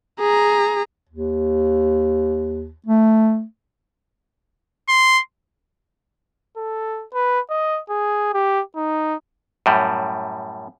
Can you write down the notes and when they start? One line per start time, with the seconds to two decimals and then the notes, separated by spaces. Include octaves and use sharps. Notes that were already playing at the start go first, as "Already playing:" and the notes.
0.20 G#4 A#5
1.09 D#2
2.86 A3
4.89 C6
6.57 A4
7.14 B4
7.50 D#5
7.90 G#4
8.34 G4
8.76 D#4
9.66 F#2 A2 G3